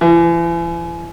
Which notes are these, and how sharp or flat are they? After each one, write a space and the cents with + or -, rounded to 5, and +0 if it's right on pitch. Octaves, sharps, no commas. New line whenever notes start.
E3 +40